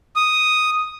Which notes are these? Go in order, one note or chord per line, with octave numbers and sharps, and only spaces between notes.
D#6